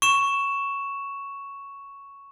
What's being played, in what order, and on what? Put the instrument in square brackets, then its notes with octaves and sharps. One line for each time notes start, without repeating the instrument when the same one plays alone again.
[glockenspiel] C#6 E7